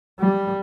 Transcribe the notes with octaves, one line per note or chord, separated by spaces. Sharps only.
G3